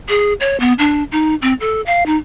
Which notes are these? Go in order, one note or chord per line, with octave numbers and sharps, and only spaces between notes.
G#4
C#5
B3
D4
D#4
C4
A4
F5
D#4